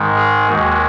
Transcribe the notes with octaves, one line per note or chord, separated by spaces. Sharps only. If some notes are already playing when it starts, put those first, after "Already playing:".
Already playing: G#2 D#3 G#3
G#4
D#2 D#3 G#3 F#4